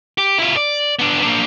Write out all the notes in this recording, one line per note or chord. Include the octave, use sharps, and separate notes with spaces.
G4
E4 F4
D5
B3 D4
A#3 D4